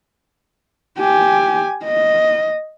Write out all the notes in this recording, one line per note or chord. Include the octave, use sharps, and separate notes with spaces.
G4 G#5
D#5